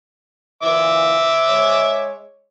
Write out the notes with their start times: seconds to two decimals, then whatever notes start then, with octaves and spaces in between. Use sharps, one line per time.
0.63 A#2 E3 E5 D6
1.48 G#3 C#5